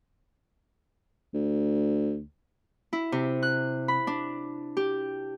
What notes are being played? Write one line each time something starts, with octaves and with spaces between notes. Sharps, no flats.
D2
E4
C3
F#6
B5
D4
G4